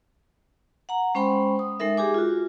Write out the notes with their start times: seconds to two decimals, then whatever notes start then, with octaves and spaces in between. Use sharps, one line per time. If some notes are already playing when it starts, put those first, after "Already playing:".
0.89 F#5 A#5
1.15 G#3 C#4 C5 G5 B5 C6
1.59 D#6
1.80 G#3 D#4 A4 A#4 E5
1.97 G4 G#4 G#5 D6
2.14 F4 F#4